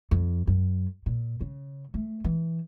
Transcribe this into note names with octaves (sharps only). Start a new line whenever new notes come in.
F2
F#2
A#2
C#3
A3
E3